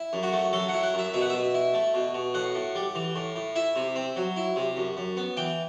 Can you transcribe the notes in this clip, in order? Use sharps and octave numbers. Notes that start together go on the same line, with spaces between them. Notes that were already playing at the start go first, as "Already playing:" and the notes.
Already playing: E4
F#2
F#4
A3
F#3 A4
F#5
E4
F#5
F#2 E5
B2 E5
F#5
B2 E5
E4
A3
B2
B2
A2 F#5
A2
G3
E3
A2
A2
E4 E5
C3
C4
F#3
E4
C3
F#2
F#2
B3
E3 G5